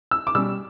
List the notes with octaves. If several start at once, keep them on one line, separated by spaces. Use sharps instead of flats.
E6
D6
B2 G3 C#4 E6